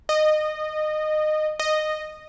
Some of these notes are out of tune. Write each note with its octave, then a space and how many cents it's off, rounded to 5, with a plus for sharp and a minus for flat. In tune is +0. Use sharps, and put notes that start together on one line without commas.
D#5 -20
D#5 -10